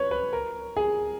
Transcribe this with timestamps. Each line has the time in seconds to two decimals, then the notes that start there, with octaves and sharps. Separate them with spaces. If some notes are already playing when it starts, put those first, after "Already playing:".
Already playing: B4 C#5
0.11 B4
0.33 A#4
0.77 G#4